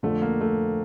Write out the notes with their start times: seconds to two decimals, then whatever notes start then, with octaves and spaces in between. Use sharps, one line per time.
0.03 F2 D3 F3 A3
0.22 A#3
0.41 A3